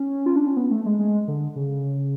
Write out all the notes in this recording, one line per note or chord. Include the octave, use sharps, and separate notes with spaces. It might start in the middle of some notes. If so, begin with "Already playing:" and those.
Already playing: C#4
F4
D4
C#4
B3
A3
G#3
G#3
D3
C#3